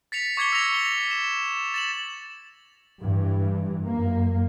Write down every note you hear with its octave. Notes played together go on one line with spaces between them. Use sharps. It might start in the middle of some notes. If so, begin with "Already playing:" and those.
A6 B6 C#7 F7
C#6 D6 G#6 B6 C#7 G7
E6 A#6 F7
G7
E7
A6 E7 F#7
G2 E3
F#2 A#3